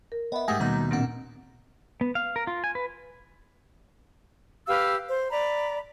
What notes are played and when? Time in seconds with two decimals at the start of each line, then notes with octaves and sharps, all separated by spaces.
0.12 A#4
0.32 B3 D#5 E5
0.48 G#2 A3 G4 G#4 F#5 G#6 A#6
0.60 D#2 B2 G3 D#4 A#5
0.91 A#2 A#3 C4 D4 F#5
2.01 B3
2.15 F5
2.36 A#4
2.47 F4
2.64 G#5
2.75 B4
4.67 G4 B4 F5 E6
5.08 C5
5.32 D5 A#5 B5